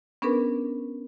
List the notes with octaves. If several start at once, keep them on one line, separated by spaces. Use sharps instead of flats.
B3 C#4 D4 G#4 A#4 B4